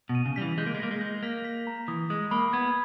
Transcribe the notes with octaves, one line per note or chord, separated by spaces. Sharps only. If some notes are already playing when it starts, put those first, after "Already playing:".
B2
D#7
C#3
G3 B6
E3
G#3 G6
A#3
G#3
A#3 A#6
G#3
G6
A#3 B6
B6
A#5
E3 D#6
G#3 D#6
A#3 B5
B3 G#6